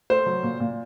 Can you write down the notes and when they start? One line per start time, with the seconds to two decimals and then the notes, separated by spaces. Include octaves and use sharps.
0.10 A3 C5
0.26 F#3
0.43 A#2
0.60 A#2